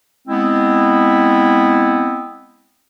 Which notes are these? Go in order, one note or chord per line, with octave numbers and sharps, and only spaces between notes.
G#3 B3 C4 E4